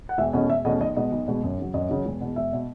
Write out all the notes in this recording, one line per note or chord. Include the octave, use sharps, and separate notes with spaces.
F#5
E1 E5
E2 B2 A3 C#4 D#5
E1 E5
E2 B2 A3 C#4 D#5
B1 D#5
B2 G#3 B3 D#5
B1
B2 G#3 B3
F#2
C#3 F#3
F#2 D#5
C#3 F#3
E1
E2 B2
E1 E5
B2